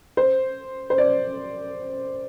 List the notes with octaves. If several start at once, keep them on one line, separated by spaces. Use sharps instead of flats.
C5
C5
D5